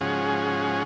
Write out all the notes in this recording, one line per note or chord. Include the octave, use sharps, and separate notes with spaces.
G#2 C#3 F3 C#4 F#4 G#4